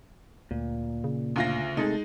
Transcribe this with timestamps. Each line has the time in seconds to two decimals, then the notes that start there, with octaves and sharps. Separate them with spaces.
0.51 D2 A#2
1.04 C#3
1.36 D2 F4 A#6
1.77 C3 G#3 A3 D#4 A4